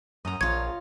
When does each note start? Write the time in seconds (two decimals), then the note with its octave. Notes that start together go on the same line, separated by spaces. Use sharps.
0.25 F#2 D#5 A#5
0.41 A#1 F4 C#5 G#6